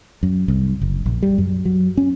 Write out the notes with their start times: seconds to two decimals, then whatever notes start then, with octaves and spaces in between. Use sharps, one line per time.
0.23 F#2
0.48 C2
0.81 F#1
1.06 A#1
1.23 G3
1.38 F#2
1.65 F#3
1.97 C#4